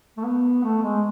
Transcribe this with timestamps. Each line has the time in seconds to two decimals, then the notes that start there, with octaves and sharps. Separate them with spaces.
0.17 A3
0.24 B3
0.63 A3
0.83 G#3